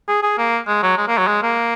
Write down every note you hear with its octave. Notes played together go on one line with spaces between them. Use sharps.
G#4
G#4
A#3
G#3
F#3
G#3
A#3
F#3
G#3
A#3